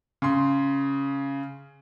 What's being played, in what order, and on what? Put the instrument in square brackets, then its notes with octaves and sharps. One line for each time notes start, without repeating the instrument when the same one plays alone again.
[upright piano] C#3 C6